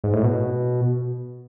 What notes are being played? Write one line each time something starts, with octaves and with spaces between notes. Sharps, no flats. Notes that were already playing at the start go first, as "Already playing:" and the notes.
G#2
A2
B2